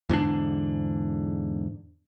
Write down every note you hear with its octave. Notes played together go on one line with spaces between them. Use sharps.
E2 G#2 D3 D4